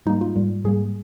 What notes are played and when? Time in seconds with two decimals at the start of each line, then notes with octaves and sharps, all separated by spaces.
0.06 G#2 G3 A#3 D#4
0.21 F4
0.35 G#2 G3 A#3
0.64 G#2 G3 A#3 G#4